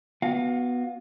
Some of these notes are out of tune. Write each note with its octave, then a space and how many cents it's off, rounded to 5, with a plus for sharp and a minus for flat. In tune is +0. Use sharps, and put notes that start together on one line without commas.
B3 -5 F#4 +0 F5 +20